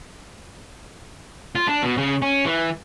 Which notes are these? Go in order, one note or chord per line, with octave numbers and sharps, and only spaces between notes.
F4
D4
B2
C#3
C#4
E3